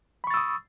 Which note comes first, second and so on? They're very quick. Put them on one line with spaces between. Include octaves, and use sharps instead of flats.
B5 C#6 A6 E6 D#6